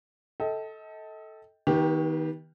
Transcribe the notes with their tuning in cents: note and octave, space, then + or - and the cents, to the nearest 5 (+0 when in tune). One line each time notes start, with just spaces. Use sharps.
A4 +0 D#5 +35 G5 +0
D#3 +25 B3 -25 G4 +0